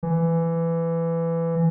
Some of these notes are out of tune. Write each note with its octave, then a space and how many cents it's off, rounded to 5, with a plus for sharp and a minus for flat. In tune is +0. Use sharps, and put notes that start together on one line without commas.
E3 +15